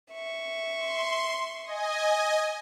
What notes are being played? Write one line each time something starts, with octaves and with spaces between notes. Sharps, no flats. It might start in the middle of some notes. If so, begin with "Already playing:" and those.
E5 C#6
C6
D#5 G#5